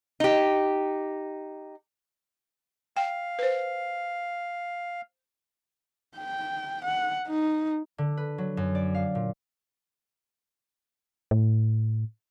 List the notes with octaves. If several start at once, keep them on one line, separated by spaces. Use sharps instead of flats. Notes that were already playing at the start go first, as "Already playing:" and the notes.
D#4 G4
F5 G5
B4 C5
G5
F#5
D#4
D3
B4
F#3
F#2
D5
F5
A#2
A2